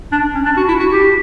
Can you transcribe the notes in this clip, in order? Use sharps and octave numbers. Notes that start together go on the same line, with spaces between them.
D4
C#4
D4
F#4
E4
F#4
G4